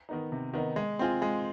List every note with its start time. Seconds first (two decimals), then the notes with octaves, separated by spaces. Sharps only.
0.09 D#3 B3 D#4
0.32 C3
0.53 D#3 B3 D#4
0.76 G#3
0.99 C4 F4 G#4
1.22 G#3